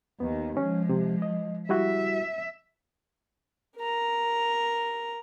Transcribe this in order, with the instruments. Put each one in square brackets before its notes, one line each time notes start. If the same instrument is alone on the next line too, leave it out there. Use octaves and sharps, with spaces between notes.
[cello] D#2 D#3 [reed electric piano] B3
[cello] F3 G#3 [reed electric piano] C#4
[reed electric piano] C3
D#5
[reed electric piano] G3 E4 F#4 [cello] E5
[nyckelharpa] A#4 A#5